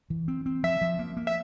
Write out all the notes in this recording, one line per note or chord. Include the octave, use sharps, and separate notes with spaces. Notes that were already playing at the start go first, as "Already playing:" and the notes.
E3
C4
C4
F3 E5
F3
A#3
A#3
E5